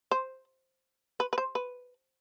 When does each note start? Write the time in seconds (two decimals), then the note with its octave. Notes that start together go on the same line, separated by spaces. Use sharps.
0.11 C5
1.20 B4
1.33 B4
1.38 C5
1.55 B4